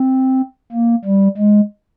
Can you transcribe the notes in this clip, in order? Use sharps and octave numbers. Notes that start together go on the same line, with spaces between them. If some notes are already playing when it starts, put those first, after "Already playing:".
Already playing: C4
A#3
G3
G#3